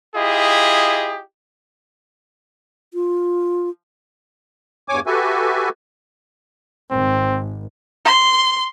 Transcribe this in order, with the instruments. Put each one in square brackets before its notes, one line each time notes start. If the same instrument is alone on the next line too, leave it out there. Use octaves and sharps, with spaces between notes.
[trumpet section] E4 F4 G4 G#4 D#5
[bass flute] F4
[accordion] E2 G2 C#5 G#5 D6
F#4 G4 A4 B4 E5 G#5
[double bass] G#1 [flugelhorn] C4
[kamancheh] C6